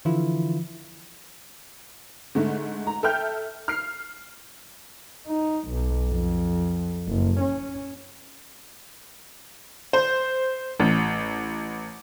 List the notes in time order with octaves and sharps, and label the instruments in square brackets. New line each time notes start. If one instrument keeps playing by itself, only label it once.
[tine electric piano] D3 E3 F3 E4 F4
[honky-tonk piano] G#2 D3 A3
A#5
A4 E5 G5 F6 G6
F6 C7
[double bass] D#4
B1
F2
F#1
C#4
[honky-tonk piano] C5
A1